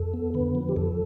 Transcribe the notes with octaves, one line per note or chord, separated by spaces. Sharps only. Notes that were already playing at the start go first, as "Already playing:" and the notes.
Already playing: F2 A4
B3
D3 B4
F3
G4
F2 A4